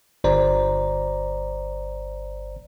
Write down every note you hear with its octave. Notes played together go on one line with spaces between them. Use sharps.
G1 C5 D5 A#5